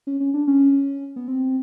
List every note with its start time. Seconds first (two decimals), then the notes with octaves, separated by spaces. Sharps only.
0.07 C#4
0.20 C#4
0.34 D4
0.47 C#4
1.16 B3
1.28 C4